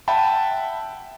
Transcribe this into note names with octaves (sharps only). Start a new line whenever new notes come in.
E5 F#5 G5 A5 B5